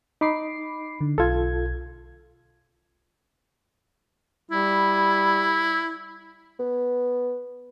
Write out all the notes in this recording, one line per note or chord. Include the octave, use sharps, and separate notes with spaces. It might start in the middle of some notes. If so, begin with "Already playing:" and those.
D#4 B5 D6 C7
D3
B1 F4 A4 G#6
G3 E4
B3